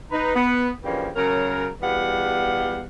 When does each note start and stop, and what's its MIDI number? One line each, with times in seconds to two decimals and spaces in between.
0.11 0.31 63
0.11 0.31 71
0.34 0.68 59
0.83 1.08 49
0.83 1.08 52
0.83 1.08 53
0.83 1.08 58
0.83 1.08 62
0.83 1.08 67
1.14 1.67 49
1.14 1.67 54
1.14 1.67 70
1.81 2.85 40
1.81 2.85 47
1.81 2.85 55
1.81 2.85 59
1.81 2.85 77
1.81 2.85 78